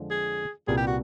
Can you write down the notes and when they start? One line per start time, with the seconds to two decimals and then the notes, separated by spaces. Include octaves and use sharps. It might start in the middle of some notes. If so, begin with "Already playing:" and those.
Already playing: F2 D3 F3 G#3
0.11 G#4
0.67 C2 A#2 G3 B3 G#4
0.77 G4
0.87 F#4